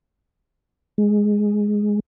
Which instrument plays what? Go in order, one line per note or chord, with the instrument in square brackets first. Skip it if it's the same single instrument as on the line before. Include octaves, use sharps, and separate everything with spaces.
[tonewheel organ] G#3